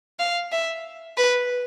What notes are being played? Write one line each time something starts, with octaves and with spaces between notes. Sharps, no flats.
F5
E5
B4